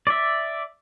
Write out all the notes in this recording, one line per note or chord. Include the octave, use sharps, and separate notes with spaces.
D5 E5